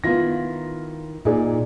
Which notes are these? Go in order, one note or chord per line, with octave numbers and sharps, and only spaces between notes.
D#3 B3 E4 F4 A#6
A#2 D#4 G#4 D5